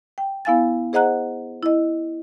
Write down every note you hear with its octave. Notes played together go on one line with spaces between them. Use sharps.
G5
B3 E4 F5 G#5 A6
G#4 C5 D#5 F#5 A#5 F#6
E4 D#5